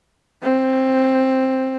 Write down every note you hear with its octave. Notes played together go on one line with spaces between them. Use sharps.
C4